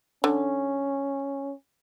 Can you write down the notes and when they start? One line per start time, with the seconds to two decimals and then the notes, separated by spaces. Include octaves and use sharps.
0.24 D3 C#4